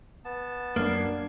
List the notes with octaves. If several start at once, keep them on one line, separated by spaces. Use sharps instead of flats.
B3 A5
F#2 A#3 D4 G#6 C7